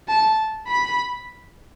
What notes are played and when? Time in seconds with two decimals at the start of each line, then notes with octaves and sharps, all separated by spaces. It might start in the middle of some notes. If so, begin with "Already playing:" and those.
0.09 A5
0.68 B5